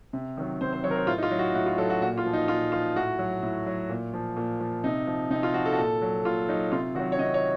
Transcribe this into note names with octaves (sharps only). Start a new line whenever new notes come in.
C3
D#3 F#3
C3 C5
C5
D#3 F#3 A#4 C#5
C5
A2 F4
D#4
F4
F#3
F#4
A2 F#4
F4
F#3 A4
F#4
A#2 F#4
F4
F3
D#4
A#2 F4
F3 F4
A2 F#4
F#3
A2
F#3
A#2
F3
A#2
F3
C3 D#4
F3
C3 D#4
F4
F3 F#4
A4
F#4
A#2 A4
F#3
A#2 F4
F#3 D#4
C3 F4
D#3 F#3 F#4
C#5
C3 D#5
C#5